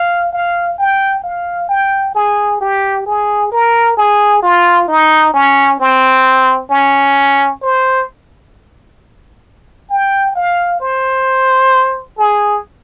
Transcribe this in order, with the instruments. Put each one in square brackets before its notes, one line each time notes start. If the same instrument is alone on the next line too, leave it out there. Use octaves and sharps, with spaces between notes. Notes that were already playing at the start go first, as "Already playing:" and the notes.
Already playing: [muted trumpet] F5
F5
G5
F5
G5
G#4
G4
G#4
A#4
G#4
F4
D#4
C#4
C4
C#4
C5
G5
F5
C5
G#4